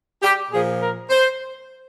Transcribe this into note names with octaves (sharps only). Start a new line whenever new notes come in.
G4
A#2 F3 G#4
A#4
C5